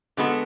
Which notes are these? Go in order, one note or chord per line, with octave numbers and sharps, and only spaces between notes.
D3 G#3 B3 F#4 A4